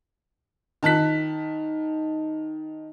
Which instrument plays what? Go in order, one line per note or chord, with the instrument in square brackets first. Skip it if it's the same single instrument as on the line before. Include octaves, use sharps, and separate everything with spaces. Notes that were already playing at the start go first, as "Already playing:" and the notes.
[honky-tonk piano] D#3 A5 F#6 B6